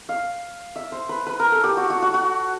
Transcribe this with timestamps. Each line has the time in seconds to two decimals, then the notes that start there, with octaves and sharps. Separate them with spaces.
0.09 F5
0.76 E5
0.92 C5
1.09 B4
1.27 B4
1.39 A#4
1.52 A4
1.64 G4
1.77 F#4
1.90 F#4
2.02 F#4
2.14 F#4